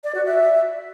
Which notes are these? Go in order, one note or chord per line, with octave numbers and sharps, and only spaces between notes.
D5
F#4
E5